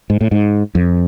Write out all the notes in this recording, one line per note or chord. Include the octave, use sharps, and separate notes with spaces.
G#2
A2
G#2
F2